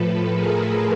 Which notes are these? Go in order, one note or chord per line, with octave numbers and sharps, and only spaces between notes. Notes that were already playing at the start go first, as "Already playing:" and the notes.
Already playing: A2 F3 A4 B4
G#4 A#4